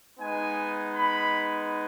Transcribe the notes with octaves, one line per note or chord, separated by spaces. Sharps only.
G#3 B3 D#4 G#5
B5